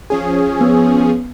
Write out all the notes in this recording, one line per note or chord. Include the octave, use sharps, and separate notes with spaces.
F3 C#4 G#4
B3